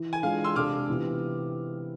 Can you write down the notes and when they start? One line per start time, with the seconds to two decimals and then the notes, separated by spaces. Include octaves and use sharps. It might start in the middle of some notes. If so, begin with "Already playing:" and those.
Already playing: E3
0.13 G#5
0.23 E3 G#3 D4 F4 G#4 F5
0.44 C6 E6
0.56 C3 G#3 D4 A4 D6 F6
0.89 C3 E3 B3 F4